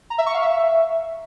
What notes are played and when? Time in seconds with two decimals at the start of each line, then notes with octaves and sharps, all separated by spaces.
0.10 A#5
0.18 E5
0.26 C#6
0.34 F5
0.42 E5